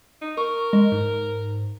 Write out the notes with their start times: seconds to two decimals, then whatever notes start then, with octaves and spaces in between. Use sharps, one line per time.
0.21 D#4
0.37 A#4 C#6
0.73 G#3
0.92 G#2